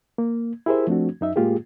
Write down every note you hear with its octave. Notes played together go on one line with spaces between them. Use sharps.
A#3
E4 G4 G#4 A#4 C5 E5
F3 A3 C4 D4 F#4
F#2 D#4 E5
A2 G#3 A#3 F4 G4 G#4